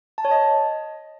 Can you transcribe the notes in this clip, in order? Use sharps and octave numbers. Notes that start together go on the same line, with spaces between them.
A5
C#5
D#5